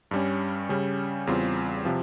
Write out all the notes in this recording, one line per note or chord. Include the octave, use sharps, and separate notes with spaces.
G2 G3 C#4
C#3 G3 C#4
E2 C#3 G3 C4 F4
C3 F3